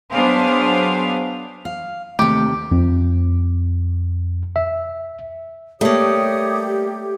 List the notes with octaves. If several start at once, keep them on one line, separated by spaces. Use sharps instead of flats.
F#3 B3 D4 G#4 C5 F5
F5
D#2 C3 A3 G4
F2
E5
G3 A3 A#3 G4 C#5 D#6